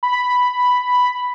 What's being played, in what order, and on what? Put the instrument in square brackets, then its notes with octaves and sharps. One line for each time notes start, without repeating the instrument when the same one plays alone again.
[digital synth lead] B5